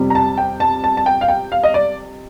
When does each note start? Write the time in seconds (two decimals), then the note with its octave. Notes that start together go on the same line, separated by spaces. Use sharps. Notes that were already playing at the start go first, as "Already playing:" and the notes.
Already playing: F2 C3 G3
0.10 A#5
0.15 A5
0.38 G5
0.60 A5
0.84 A5
0.97 A5
1.06 G5
1.21 F5
1.28 G5
1.52 F5
1.64 D#5
1.74 D5